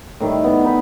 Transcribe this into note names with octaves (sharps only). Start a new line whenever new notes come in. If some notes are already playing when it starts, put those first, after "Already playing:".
A2 D#3 G3
B3
D#4 B4